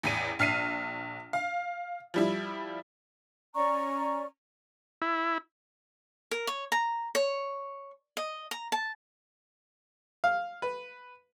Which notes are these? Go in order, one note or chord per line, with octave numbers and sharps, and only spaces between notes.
A1 E2 D#7
A#1 F6 C7 D#7
F5
F3 G3 E4
C#4 D5 A#5 C#6
E4
A#4
C#5
A#5
C#5
D#5
A#5
A5
F5
B4